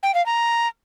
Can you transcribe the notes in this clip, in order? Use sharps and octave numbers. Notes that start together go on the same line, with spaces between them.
G5
F5
A#5